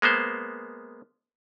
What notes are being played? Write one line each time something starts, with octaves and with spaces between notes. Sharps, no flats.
G#3 A#3 B3 C5